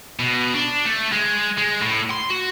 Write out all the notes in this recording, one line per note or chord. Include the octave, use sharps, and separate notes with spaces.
B2
D4
A3
G#3
G#3
A2
C6
F#4